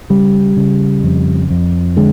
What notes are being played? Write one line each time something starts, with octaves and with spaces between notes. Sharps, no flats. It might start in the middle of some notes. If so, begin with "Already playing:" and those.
C#3 G3
C#3
F2
F2
D3 G#3